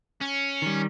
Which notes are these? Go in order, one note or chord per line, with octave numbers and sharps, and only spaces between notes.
C#4
D#3 G3